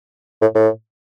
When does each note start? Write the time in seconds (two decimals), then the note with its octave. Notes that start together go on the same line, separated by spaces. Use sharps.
0.42 A2
0.55 A2